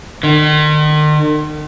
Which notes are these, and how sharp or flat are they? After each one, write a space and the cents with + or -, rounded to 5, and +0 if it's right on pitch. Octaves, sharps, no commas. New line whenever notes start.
D#3 -40